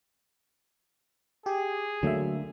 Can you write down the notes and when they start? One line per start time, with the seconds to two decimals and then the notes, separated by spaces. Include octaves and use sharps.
1.46 G4 G#4
2.03 D3 F#3 A3 A#3 E5